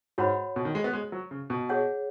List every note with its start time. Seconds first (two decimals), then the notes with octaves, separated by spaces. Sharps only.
0.18 G#2 F#4 C#5 F#5 B5
0.56 B2
0.65 D#3
0.75 G#3
0.84 B3
0.93 G#3
1.12 F#3
1.31 C#3
1.50 B2
1.69 G#4 C#5 F#5